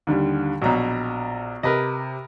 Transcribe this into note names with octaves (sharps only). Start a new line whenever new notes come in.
D#2 D3 G3
A#1 B2 F#3 A#5
C3 A#4 B4 D#5